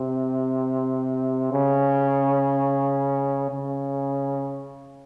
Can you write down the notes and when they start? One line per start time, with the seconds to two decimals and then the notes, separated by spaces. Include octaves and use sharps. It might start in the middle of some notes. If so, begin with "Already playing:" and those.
Already playing: C3
1.52 C#3
3.50 C#3